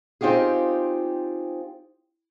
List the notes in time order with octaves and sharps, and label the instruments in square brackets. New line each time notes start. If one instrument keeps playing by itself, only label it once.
[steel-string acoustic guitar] C4 D#4 F4 G4 G#4